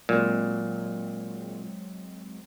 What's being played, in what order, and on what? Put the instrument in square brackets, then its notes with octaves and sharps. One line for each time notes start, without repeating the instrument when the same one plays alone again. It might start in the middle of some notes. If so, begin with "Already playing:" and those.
[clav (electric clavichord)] A#2 [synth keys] F#3 G#3 C4